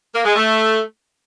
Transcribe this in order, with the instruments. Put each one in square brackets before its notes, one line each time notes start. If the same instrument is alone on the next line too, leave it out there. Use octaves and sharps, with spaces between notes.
[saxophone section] A#3
G#3
A3